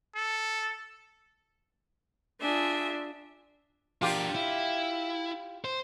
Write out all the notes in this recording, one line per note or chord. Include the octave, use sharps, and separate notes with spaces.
A4
D4 F4 G#4 E5
D4 F4 G4 A#4
E4
C5